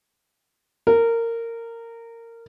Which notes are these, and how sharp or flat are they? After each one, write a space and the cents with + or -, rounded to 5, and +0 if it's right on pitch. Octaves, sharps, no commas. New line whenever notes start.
A#4 -20